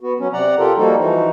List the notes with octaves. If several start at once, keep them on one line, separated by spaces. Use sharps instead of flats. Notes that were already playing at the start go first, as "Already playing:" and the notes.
B3 F#4
F#3 C#4
C3 D5 F#5 A#5
F4 G4 A4 A#4
F3 G3 A#3 D#4 F#4 A4
E3 F3 D#4 F#4